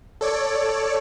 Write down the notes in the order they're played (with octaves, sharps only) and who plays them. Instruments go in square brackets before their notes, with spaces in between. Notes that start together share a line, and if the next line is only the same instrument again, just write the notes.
[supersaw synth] A4 C#5 D5